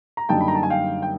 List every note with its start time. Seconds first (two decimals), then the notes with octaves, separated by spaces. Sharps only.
0.17 A#5
0.29 F#2 D3 G3 A#3 D#4 G5 A5
0.41 B5
0.48 A#5
0.55 A5
0.63 G#5
0.70 F5 G5
1.02 G5